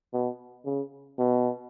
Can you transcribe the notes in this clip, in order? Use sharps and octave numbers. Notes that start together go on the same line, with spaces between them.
B2
C#3
B2